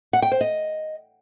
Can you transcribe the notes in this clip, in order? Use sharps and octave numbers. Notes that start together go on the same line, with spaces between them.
F#5
G5
C5
D#5